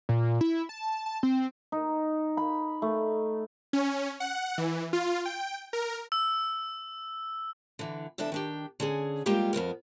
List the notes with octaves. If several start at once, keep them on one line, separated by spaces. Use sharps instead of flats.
A#2
E4
A5
A5
C4
D#4
B5
A3
C#4
F#5
E3
F4
G5
A#4
E6
D3 E3
E2 C3 D4 A4 E5
D#3 D4 G4
D3 C#4 G#4
G3 G#3 A#3 F4 G4 G5
F2 G#3 B3 A#4